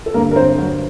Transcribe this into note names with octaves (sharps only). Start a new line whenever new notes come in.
A4
G2 D3 A#3 A#4
A#4
C4 C5
F#3 F#4